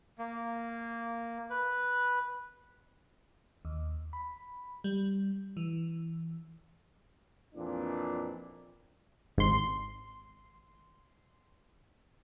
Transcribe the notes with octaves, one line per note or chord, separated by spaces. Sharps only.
A#3
B4
D#2
B5
G3
E3
F2 A#2 E3 D4
G#1 C6